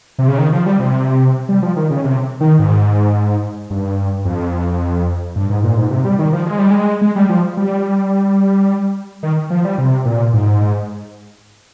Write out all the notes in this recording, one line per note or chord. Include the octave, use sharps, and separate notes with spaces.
C3
C#3
D#3
F3
G3
C3
G3
F3
D#3
C#3
C3
D#3
G#2
G2
F2
G2
G#2
A#2
G#2
C3
G3
D#3
F3
G#3
G3
G#3
G#3
G3
F3
G3
D#3
F3
G3
C3
A#2
G#2